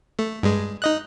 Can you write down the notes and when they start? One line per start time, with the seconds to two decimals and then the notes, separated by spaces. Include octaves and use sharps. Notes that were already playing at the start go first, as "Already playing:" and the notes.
0.19 A3
0.43 G2 G#3
0.82 D#4 D#5 F#6